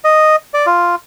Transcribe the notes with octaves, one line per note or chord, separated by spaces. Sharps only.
D#5
D5
F4